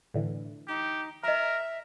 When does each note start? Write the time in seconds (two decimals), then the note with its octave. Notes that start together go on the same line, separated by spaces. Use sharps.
0.14 A2 D3 E3
0.68 D#4 G4
1.24 A#4 D#5 E5 A#5